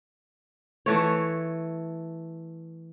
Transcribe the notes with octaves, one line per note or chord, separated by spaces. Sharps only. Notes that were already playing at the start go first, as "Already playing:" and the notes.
E3 A3 C#5